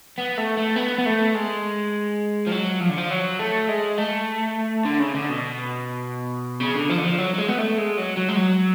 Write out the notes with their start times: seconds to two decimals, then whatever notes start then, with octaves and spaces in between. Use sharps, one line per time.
0.18 B3
0.37 A3
0.57 A3
0.76 B3
0.98 B3
1.06 A3
1.35 G#3
2.47 F3
2.52 F#3
2.81 F3
2.89 D3
2.97 F3
3.11 F#3
3.39 A3
3.69 G#3
3.98 A3
4.85 D3
4.99 C#3
5.15 D3
5.29 B2
6.60 C#3
6.76 D3
6.90 F3
6.98 D3
7.04 F3
7.18 F#3
7.34 F#3
7.38 G#3
7.48 B3
7.58 A3
7.78 G#3
7.97 F#3
8.17 F#3
8.28 G#3
8.36 F#3